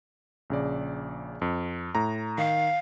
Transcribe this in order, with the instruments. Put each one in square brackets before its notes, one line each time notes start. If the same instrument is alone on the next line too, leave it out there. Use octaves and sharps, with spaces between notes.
[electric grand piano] A#1 C#3 D5
F2
A2 A#5
[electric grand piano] D#3 [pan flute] F5